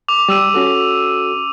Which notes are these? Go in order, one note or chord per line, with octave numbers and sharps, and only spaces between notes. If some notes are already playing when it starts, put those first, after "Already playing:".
D6 F7
G3 D6 E6 D#7
C#4 F#4 A4